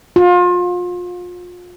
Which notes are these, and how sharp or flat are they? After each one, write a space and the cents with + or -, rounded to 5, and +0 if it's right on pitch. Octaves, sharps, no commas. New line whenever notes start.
F4 +30